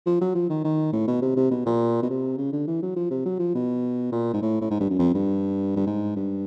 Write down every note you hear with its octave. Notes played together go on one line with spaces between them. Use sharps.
F3
F#3
F3
D#3
D#3
A2
B2
C3
C3
B2
A#2
B2
C3
C#3
D3
E3
F#3
F3
C3
F#3
F3
B2
A#2
G#2
A2
A2
G#2
G2
F#2
F2
G2
G2
G#2
G2